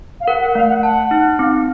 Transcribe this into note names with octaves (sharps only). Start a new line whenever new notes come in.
F5
A#4 F#5
F#5
A3 F5
F#5
F#5 A5
D#4
C4